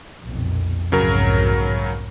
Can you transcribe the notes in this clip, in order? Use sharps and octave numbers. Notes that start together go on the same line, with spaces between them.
B1 F2 A#2
B1 F2 G#2 C#3 F#3 A#4